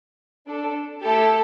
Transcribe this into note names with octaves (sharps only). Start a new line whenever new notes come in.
D4 A4
A3 E4 G4 A4